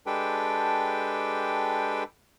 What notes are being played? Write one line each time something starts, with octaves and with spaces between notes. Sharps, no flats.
G#3 D4 G4 A4 B4 G5